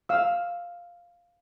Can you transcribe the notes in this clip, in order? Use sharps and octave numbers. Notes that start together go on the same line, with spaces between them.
F5 E6